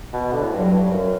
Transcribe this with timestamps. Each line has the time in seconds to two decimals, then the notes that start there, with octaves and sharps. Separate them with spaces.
0.13 B2
0.33 D3
0.43 A2
0.52 G2 F#3
0.73 G2
0.92 F#2